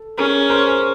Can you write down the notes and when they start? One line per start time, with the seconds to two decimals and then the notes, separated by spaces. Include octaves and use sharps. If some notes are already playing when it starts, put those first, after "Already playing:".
Already playing: A4
0.18 C#4 G#4 A#4
0.50 A#4 C5